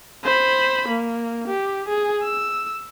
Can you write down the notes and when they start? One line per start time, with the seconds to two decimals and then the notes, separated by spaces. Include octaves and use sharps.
0.24 C5 B5
0.89 A#3
1.48 G4
1.88 G#4
2.23 E6